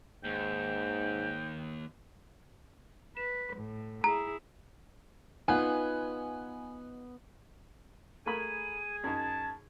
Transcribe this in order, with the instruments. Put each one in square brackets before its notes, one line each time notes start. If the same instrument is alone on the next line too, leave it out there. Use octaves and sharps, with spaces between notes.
[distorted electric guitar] D#2 [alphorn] G#2 [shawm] G5
[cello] B4 [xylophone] E7
[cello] A2
[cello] E4 G#4 [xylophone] A#5
[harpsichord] B3 [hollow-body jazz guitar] D#4 F4 [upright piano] G#5 F#6
[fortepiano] A3 A#4 B5 [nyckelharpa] G#4 G#5 [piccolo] D#7
[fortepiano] F#2 D#4 [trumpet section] A5 [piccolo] G#6